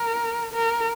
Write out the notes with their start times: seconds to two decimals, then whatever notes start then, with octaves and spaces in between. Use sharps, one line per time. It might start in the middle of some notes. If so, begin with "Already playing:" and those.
Already playing: A#4
0.54 A#4